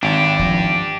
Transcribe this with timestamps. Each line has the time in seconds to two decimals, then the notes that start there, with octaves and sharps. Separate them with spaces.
0.03 G#1 D4 G4
0.39 F3